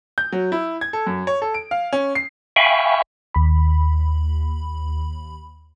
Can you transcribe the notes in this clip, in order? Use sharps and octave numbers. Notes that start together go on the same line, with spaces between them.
G6
F#3
E4
G#6
A4
F#2
C#5
A4
D7
F5
C#4
C7
E5 F5 G5 G#5 B5 C#6
D#2 B5